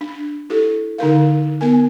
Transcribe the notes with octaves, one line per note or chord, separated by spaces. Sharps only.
D4
E4 G4 A4
D3 D#4 A#4 F5
B3 A#4 G#5